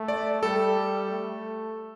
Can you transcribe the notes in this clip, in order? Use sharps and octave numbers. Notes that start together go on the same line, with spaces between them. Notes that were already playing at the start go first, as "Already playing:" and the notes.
Already playing: A3
D5
G3 A4
A3